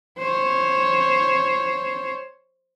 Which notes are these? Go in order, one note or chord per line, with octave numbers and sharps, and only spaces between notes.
C5 C#5